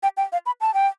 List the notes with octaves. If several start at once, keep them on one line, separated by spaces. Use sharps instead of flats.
G5
G5
F5
B5
A5
G5